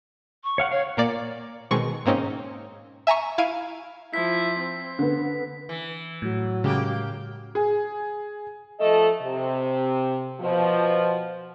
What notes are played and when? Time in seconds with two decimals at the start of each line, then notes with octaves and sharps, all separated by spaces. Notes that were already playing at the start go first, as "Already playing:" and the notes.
0.44 C#6
0.58 C#5 F5 F#5
0.71 C#5 F5
0.97 A#2 A#3 D5
1.71 B2 D#3 G#3 C4 C#6
2.06 G#2 A#3 C4 C#4 D#4
3.07 E5 G#5 A#5 C#6
3.38 E4 F5 G#6 D7 D#7
4.14 F3 E4 B6
4.59 C4
4.99 D3 B3
5.69 E3
6.22 A2 F#3
6.64 C#3 G#3 A#3 G4
7.55 G#4
8.80 F3 A3 A4 D#5
9.22 C3
10.41 B2 F3